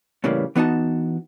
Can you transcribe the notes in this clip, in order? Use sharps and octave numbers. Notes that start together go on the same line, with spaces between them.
A2 C#3 E3 G3 A#3
E3 B3 D#4 F#4 A5